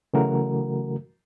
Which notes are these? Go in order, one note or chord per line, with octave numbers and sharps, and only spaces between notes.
C#3 E3 F#3 A3 F#4 A#4